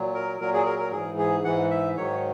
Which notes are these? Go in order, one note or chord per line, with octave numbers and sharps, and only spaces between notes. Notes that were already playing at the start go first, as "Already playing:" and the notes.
Already playing: A#2 F#3
A#4
A#2 F#3 A#4
G#4
A#4
A#4
G#2 E3 G#4
G#4
G#2 E3 F#5
E5
G#2 D#3 F#3 C#5